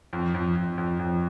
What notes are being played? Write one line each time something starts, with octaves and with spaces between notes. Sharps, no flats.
F2
F2
F2
F2
F2